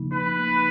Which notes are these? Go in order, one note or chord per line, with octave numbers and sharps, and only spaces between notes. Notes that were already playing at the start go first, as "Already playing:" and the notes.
Already playing: C#3 F3 A#3 D#4
D#4 B4
A#3